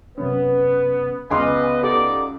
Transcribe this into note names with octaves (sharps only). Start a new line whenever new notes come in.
F#2 C3 B3 C#4 B4
C#2 B3 B4 D#5 G#5 C6 D6 F6
D#4 G4 A4 D5 F#5 D6